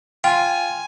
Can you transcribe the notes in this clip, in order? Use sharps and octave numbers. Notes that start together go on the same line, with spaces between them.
F4 G5 G#5